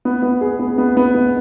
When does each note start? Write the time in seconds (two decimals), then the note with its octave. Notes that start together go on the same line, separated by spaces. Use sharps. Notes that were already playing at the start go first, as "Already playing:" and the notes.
0.05 B3
0.23 B3
0.41 G#4
0.59 B3
0.78 B3
0.97 B3
1.15 B3